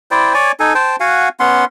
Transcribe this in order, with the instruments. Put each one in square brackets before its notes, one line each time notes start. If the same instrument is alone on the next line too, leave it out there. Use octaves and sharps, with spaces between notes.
[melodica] E4 C5 D5 G5
C#5 D5 G#5
D#4 A4 G#5
C5 G5 A5
F#4 F5 F#5 G#5
B3 C#4 F#5 C6